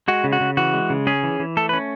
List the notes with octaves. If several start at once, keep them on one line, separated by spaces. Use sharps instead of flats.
G#3 F#4
C#3
F#4
C#3
E3 F#4
G#3
C#3
C#4 G#4
E3
E3
A3 A4
B4
C#4